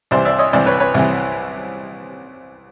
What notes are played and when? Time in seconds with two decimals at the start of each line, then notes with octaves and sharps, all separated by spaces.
0.11 C2 C3 E3 C5 D5
0.25 D5 E5
0.39 C#5 D#5
0.53 C2 C3 E3 C5 D5
0.66 B4 C#5
0.80 B4 C#5
0.94 C2 C3 E3